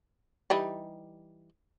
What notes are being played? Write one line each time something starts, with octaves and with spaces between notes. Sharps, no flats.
E3 G3 D#4